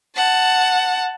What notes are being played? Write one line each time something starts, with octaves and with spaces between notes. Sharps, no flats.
F#5 A5